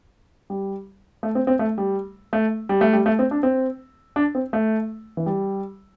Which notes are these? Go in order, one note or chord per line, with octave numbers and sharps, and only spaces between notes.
G3
A3
C4
C4
A3
G3
A3
G3
A3
G3
A3
C4
D4
C4
D4
C4
A3
E3
G3